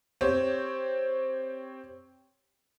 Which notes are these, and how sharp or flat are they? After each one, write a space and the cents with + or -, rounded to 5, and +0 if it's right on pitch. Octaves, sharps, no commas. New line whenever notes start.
C4 +5 G4 +0 C#5 +0